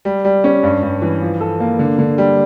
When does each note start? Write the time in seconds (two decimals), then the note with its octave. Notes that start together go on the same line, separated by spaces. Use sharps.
0.05 G3
0.25 G3
0.44 C#4
0.63 G2
0.82 G2
1.02 E3
1.21 F3
1.41 A4
1.60 A#3
1.79 D3
1.98 D3
2.18 G3